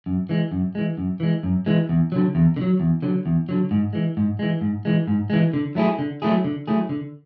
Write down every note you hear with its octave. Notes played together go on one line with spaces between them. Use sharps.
F#2
E3 G#3
F#2
E3 G#3
F#2
E3 G#3
F#2
E3 G#3
E2
D3 F#3
E2
D3
F#3
E2
D3 F#3
E2
D3 F#3
G#2
E3 G#3
G#2
E3 G#3
G#2
E3 G#3
G#2
E3 G#3
D3
F#3 A3 E4 G#4
D3
F#3 A3 E4 G#4
D3
F#3 A3 E4 G#4
D3